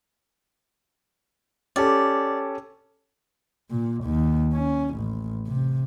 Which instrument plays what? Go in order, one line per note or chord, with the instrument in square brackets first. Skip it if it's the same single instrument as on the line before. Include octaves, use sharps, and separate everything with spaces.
[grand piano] C#4 G4 A4 [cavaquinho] D5
[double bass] A#2
D#2
C#4
A1
C3